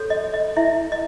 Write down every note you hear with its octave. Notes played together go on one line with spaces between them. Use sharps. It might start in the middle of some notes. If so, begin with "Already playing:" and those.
Already playing: F#4 A4 C#5
D#5
D#5
E4 E5
D#5